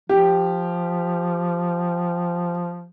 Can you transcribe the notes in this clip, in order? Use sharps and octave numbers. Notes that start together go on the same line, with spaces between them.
F3 G4